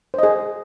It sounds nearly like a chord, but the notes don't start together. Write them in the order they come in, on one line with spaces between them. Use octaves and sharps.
C5 D#5 G#4